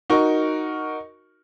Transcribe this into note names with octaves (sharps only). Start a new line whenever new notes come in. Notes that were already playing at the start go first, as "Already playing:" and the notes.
D#4 F#4 A#4 C#6